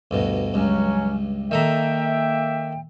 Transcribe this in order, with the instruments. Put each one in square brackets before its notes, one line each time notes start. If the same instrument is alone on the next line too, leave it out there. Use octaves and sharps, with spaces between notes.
[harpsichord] D2 G2 B2
[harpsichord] C#2 G2 [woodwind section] F#3 C#4
[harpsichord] D#3 A4 A#5 [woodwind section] A#3 E5 G5